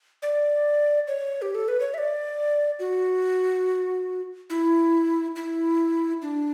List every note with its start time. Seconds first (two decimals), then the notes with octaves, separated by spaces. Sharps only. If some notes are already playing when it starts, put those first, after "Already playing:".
0.22 D5
1.08 C#5
1.42 G4
1.55 A4
1.68 B4
1.80 C#5
1.94 E5
1.98 D5
2.79 F#4
4.50 E4
5.36 E4
6.22 D4